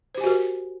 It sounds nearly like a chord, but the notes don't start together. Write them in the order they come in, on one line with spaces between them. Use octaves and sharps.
C5 G4 G#5 F#4 A#4